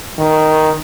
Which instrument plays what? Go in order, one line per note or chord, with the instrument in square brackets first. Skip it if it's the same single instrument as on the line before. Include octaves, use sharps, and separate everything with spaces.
[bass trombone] D#3